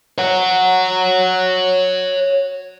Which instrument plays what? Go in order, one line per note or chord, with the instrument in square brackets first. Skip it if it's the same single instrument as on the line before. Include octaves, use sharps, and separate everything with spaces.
[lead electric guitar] C#5 F#5